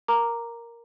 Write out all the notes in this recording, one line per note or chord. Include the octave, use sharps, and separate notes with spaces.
A#4 A#5 D6